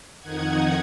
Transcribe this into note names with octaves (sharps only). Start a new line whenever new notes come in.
F2 D#3 D#4 F#5 G#6